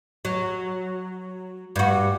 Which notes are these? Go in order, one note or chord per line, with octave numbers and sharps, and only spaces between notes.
F#3
G2 F#4